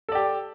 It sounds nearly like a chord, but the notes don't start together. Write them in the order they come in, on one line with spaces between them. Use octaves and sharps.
A4 D5 G4